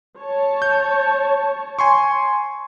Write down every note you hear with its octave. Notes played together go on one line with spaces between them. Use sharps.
C#5 A5
G6
G#5 C6 C#6